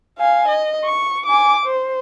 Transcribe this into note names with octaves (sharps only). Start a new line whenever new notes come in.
F5 G#5
D#5
C#6
G#5 D6
C5